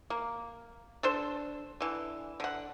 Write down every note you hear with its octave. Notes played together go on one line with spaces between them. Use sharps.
A#3
D4 A4 C5
D3 E3
D3 F#5